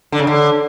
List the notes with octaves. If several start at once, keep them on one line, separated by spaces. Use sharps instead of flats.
D3
C#3
D3